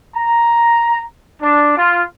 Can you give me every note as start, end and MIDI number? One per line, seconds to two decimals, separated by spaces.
0.16 1.02 82
1.42 1.76 62
1.77 2.03 65